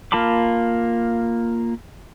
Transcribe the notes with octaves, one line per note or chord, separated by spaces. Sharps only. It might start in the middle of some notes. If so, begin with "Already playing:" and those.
A#3 F4 A5 B5 D6